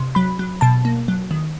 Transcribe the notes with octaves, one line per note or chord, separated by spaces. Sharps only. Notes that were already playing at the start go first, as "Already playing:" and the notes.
Already playing: C3
F#3 B5
F#3
B2 A5
A#3
F#3
D#3